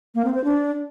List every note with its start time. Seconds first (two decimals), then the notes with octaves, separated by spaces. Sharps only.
0.15 A#3
0.25 C4
0.34 C5
0.44 D4